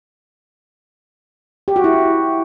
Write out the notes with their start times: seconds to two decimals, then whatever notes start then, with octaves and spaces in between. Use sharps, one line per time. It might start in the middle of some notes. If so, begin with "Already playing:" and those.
1.68 G4
1.76 F#4
1.84 E4